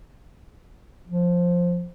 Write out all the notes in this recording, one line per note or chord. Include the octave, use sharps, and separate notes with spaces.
F3